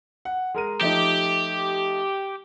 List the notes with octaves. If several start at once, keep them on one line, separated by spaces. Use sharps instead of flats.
F#5
G#3 A#4 D#7
F3 A3 D#4 G4